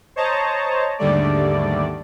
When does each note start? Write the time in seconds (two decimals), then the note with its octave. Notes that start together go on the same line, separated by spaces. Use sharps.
0.16 C5 C#5 D#5 A5 A#5
0.98 D#2 G#2 D3 G3 A3 D5